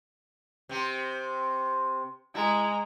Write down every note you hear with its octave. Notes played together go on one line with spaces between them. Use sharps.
C3 C4
G#3 E4 A#5